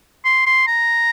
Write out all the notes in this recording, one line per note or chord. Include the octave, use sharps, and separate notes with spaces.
C6
C6
A#5